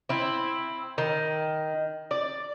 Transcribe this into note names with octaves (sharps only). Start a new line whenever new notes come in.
C4 E4
D#3
D5